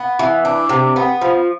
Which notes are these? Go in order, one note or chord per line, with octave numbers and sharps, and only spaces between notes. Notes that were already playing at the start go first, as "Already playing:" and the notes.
Already playing: B3
E3
D4
C3
B3
F3